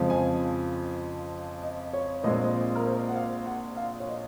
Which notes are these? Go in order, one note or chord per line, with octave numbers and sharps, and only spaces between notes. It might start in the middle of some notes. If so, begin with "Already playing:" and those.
Already playing: F2 C#3 F3 G#3 C4
G#5
D#5
C#5
A#1 A#2 G#3 C4 D#5
D#5
A#4
C5
F#5
F5
F#5
F5
C#5
D#5